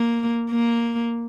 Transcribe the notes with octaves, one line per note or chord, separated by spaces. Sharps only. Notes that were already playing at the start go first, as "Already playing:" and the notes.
Already playing: A#3
A#3